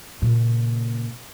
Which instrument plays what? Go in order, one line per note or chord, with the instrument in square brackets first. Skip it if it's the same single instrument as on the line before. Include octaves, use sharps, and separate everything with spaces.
[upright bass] A#2 C#3